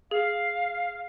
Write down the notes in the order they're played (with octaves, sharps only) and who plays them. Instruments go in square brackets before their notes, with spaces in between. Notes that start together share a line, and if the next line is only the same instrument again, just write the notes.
[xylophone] G#4 [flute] F5